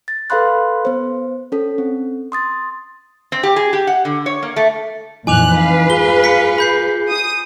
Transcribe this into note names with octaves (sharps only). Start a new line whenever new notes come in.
A6
A4 B4 F5 B5 C6 F#6
B3 C5
C#4 A4
C4
C6 D#6 A6
C4
G4
G#4
G4
F#5
D3
C#5
A#3
A3
F2 A#2 E3 D#4 G#5 D6 F#6 F7
B4 F5
F4 G#4 G7
B6 C#7
B5 G6 C7
D#6